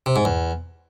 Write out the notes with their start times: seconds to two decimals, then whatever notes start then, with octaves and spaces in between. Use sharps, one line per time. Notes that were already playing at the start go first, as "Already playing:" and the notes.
0.06 C3
0.16 G#2
0.25 E2